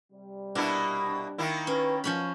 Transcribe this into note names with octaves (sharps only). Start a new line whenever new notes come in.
C3 G3
B2 A#3 D4 E4
D#3 A#3 E4
C#4 B4
F#2 B2 D#3 F3 C#4 B5